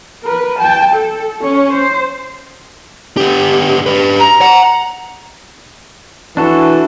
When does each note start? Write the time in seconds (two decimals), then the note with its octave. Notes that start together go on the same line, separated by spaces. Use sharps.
0.24 A#4 B4
0.59 G5 A5
0.94 A4
1.43 C#4 C#5
1.73 C5
3.17 B3 G4
3.86 G4 B4
4.18 A#5
4.41 F#5
6.37 E3 D4 F#4 A4